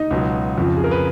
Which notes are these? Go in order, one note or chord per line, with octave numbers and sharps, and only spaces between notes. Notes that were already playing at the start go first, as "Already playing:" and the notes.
Already playing: D#4 D#5
C#2 B2 F#3
F2 C#3 F3
G#4
A#4
B4